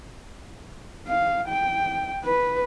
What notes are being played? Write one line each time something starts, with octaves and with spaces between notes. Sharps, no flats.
F5
G5
B4